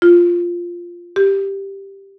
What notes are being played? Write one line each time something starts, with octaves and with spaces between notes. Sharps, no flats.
F4
G4